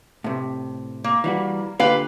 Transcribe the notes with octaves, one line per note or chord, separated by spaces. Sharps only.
A2 C3
A#3
E3 G3 F#4
A#2 D3 G4 B4 F5